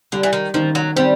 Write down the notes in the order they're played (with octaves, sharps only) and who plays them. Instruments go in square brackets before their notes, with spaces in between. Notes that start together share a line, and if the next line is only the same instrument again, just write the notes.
[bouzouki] D3 [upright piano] G3
[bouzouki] E3
D#3
[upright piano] D#3 [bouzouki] F3
[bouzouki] F#3
[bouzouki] G3 [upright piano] C4